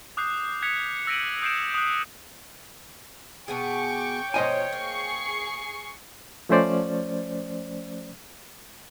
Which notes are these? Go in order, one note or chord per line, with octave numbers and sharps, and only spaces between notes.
D6 D#6 F#6 G6 C7
D#6 F#6 G#6 B6 C#7 F7
E6 A#6 B6 D7 D#7 F#7
D#6 G6 C7 D7 E7
D#6 F#6
B2 B3 G#4 G5 C#6 D6
B2 F3 C5 C#5 D#5 G#5
A#3 G#4 C#6 C7
F3 A3 C#4 C5 D5